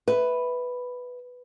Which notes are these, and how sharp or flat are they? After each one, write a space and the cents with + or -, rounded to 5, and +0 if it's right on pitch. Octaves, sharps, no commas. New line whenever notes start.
B4 +0 E5 -15